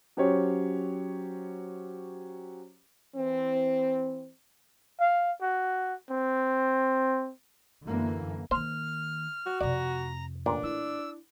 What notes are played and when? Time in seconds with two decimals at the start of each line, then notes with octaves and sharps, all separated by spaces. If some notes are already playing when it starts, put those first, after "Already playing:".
0.17 F#3 C#4 G4 C5 C#5
3.16 E3 C4
5.00 F5
5.41 F#4
6.11 C4
7.84 F#2 D3 E3 A#3
8.51 D#3 A#3 C5 F6
9.46 F#4
9.61 F2 C3 D5 A#5
10.46 A1 A#2 D4
10.63 E4 E6